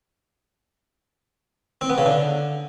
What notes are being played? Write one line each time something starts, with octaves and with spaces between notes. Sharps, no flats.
C4
B3
C#3
D3